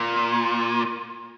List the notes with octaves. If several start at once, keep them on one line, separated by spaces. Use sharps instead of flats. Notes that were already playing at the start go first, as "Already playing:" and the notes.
Already playing: A#2